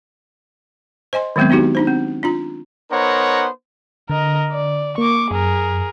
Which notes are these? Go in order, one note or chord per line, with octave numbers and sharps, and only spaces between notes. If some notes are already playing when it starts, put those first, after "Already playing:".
C5 D#5 G#5 C6
D#3 F#3 G#3 B3 C4
B3 D4 D#4 F#4 G4
D4 D#4 C5
C4
D4 F4 A#5
B3 D#4 A#4 C5 C#5 F#5
D3 A#4 D#5
D5
A#3 C#6 D6
F#2 G#4 A#4